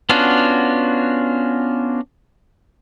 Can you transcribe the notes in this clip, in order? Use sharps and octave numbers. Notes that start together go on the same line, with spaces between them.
B3 C#4 D4 F4 F#4